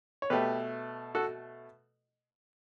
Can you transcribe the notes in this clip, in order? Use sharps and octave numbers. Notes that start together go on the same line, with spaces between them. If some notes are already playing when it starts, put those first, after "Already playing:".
C#5
B2 A3 G4 B4
F#4 A4